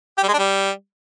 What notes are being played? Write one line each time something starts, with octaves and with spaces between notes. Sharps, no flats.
G4
G3
G#3
D4
G3